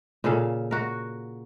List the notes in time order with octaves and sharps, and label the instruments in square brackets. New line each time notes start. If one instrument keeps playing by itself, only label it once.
[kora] A#2 C#3 A4 F5
F#4 A#4